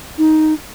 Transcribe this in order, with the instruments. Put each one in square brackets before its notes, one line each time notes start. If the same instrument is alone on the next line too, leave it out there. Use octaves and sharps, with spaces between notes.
[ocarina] D#4